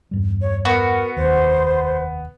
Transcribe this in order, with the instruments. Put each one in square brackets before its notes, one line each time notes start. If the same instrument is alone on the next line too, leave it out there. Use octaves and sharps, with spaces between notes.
[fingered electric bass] E2 G2 G3
[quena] C#5
[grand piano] B3 [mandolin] F#4 [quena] A#4
[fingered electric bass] F1 D#2 [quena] C5